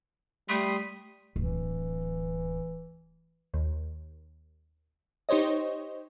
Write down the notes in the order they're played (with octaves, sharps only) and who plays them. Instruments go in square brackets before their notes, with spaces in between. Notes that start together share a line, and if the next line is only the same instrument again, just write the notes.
[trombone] G3 [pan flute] A3 [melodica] B5 C6 D#6
[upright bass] D1 [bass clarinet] E3
[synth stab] D#2
D#4 G4 C5 C#5 D#5